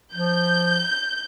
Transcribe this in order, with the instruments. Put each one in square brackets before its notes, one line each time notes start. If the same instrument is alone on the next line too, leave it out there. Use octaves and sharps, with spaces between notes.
[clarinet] F3 [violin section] G6